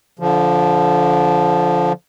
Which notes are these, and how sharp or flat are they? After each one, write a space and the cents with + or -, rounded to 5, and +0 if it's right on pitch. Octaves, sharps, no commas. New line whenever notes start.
D3 -20 F3 +0